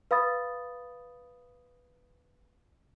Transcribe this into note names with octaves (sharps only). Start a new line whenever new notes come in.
B4 F5 B5 D#6 A6